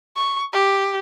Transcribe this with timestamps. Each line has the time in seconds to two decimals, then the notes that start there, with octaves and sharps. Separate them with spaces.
0.16 C#6
0.53 G4